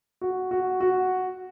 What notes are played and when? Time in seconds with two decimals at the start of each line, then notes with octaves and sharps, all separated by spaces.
0.21 F#4
0.51 F#4
0.80 F#4